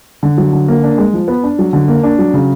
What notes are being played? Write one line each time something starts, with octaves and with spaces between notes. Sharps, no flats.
D3
F#3
D3
A#3
D4
G#3
F3
B3
D4
F#3
D3
A#3
D4
F#3
C#3